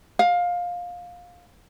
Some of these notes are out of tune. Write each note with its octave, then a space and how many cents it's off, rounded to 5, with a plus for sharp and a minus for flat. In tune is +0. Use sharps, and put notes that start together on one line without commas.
F5 +20